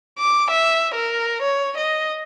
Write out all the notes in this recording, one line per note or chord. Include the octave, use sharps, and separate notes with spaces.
D6
E5
A#4
C#5
D#5